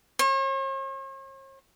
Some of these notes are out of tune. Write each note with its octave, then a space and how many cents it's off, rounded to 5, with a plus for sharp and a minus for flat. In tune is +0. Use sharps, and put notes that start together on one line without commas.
C#5 -45